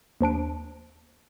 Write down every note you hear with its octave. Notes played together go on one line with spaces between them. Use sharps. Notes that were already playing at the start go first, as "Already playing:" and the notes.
D#2 F3 D4 D7